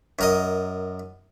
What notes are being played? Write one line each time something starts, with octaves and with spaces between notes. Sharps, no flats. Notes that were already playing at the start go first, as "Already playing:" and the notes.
F#2 A#4 D#5